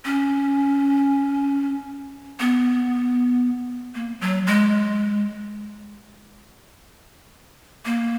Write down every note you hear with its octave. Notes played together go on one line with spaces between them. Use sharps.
C#4
B3
A#3
F#3
G#3
A#3